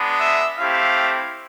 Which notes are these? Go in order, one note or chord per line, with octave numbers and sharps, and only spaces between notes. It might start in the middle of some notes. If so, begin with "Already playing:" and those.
Already playing: G#3 B3 D4
E5
A3 C4 E4 G4 F5